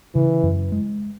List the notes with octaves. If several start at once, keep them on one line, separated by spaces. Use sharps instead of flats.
C#3 E3
F#2
G#3